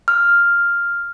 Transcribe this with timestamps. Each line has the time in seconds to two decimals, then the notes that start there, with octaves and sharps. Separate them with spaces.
0.08 F6